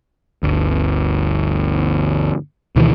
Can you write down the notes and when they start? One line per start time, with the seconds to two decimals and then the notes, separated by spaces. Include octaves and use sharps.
0.43 G1 D2
2.76 D2 B2 D#3 E3